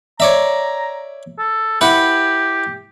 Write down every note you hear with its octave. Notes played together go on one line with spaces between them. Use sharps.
C#5 D5 E5 A#5
A4
E4 G4 B4 F#5